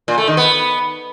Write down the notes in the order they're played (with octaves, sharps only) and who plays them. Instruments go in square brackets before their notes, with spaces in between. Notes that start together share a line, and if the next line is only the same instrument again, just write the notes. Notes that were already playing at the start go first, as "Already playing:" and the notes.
[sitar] A#2
A3
D#3
B3